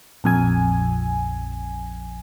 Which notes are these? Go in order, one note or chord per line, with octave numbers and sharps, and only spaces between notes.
A#1 F2 G#5